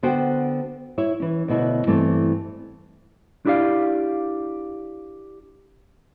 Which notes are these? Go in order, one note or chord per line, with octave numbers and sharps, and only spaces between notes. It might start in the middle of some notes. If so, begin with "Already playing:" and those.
D3 B3 F#4 C5 F#5 G5
E4 C#5
E3 C#4
D2 B2 E4 C#5
G2 E3 A3 C4
D4 E4 G4 D5 F5